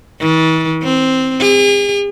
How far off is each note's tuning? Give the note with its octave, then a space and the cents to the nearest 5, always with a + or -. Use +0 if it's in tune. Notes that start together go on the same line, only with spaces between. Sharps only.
E3 -45
C4 +0
G#4 -45